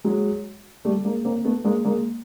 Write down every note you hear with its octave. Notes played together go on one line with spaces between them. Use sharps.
F#3 G#3
G3 A3
G#3 A#3
A#3 C4
A3 B3
G#3 A#3
G#3 A#3